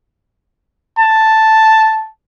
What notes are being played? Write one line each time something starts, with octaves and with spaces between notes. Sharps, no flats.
A5